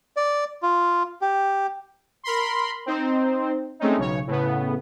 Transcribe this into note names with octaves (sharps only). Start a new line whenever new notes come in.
D5
F4
G4
A#4 B5 C6
C4 D#4 C5
G#3 A3 C4 C#4 D#4
B1 C#3 C#5
A2 C#3 B3